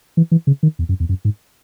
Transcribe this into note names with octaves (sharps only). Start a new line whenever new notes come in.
E3
E3
C#3
D#3
E2
F#2
E2
F#2
G#2